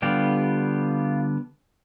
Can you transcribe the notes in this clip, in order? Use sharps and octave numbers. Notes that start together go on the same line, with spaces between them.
D3 G3 B3 F4 G4